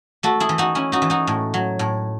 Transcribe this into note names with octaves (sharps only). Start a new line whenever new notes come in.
A3 F#4 A4
E4 G#4
E3
D#4 F#4
C#4 E4
D#4 F#4
E3
D#4 F#4
A2
F#3
A2